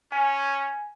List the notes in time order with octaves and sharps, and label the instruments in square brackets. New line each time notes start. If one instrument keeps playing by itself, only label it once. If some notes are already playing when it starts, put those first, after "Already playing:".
[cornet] C#4 [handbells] G#5